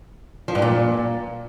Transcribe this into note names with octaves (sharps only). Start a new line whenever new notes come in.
F3
G2
A#2